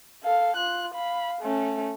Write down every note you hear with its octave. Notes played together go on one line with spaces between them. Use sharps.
A4 F5
F4 F#6
F5 B5
A3 C#4